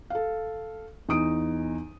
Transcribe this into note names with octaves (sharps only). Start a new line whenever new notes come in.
A4 F5
E2 D#4 D#6 D7